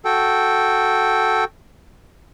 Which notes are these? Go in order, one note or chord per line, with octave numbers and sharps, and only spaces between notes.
F#4 A4 G5